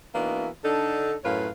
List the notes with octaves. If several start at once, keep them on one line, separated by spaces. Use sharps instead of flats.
E3 A#3 B3 D4 D#4 F#4
D3 D4 D#4 A4
F#2 A2 F4 B4 C#5 F5